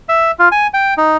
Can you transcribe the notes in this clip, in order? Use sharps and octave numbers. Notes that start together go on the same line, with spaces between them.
E5
F4
G#5
G5
D#4